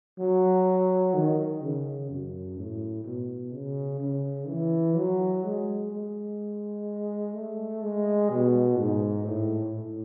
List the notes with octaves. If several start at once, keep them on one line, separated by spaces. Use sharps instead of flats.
F#3
D#3
C#3
F#2
A2
B2
C#3
C#3
E3
F#3
G#3
G#3
A3
G#3
B2
G#2
A2
A2